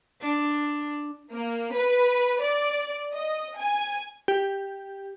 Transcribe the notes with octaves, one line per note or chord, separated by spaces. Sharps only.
D4
A#3
B4
D5
D#5
G#5
G4